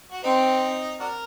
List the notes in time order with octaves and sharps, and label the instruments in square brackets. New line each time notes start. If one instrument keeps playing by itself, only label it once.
[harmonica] F#4
[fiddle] C4 [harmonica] D#4
[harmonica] D4 F#4 A#4